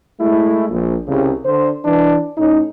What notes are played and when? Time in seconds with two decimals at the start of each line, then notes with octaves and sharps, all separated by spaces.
0.20 G#3 A3 E4
0.70 A#1
1.08 C2 C#3
1.45 D3 C5
1.85 E3 D4
2.38 A2 C#4 D#4